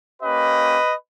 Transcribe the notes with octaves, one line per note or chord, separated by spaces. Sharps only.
A#3 C#4 G4 B4 D#5